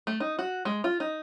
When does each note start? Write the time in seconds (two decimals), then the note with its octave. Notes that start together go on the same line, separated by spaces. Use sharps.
0.07 A3
0.20 D#4
0.39 F#4
0.65 G#3
0.84 F4
1.00 D#4